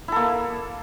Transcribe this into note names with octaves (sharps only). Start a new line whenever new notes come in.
A#3 E4 A4